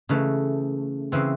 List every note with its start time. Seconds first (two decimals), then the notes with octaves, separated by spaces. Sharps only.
0.09 C#3 E3 A3
1.12 C#3 E3 C4